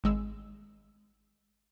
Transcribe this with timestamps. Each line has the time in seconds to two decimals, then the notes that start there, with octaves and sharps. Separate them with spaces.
0.04 G#1 G#3 E6